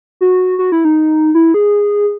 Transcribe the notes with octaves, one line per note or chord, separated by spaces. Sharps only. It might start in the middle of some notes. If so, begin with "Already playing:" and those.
F#4
F#4
E4
D#4
E4
G#4